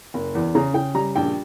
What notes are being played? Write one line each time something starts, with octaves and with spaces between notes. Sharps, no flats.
F#1
E2
C#3 A#5
C#3 G5
G3 A#5
A#1 G5